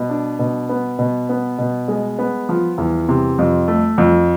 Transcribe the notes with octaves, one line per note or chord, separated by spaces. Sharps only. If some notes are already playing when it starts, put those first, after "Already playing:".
Already playing: B2
D4
B2
B3
B2
B3
B2
G#3
B3
F3
E2
C3
F2
A3
F2